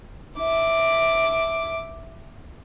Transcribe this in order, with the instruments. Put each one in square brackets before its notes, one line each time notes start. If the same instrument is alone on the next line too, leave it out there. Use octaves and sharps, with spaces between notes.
[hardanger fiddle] E4 D6